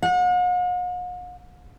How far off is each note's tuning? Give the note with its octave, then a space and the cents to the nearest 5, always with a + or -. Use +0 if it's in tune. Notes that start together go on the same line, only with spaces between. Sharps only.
F#5 -45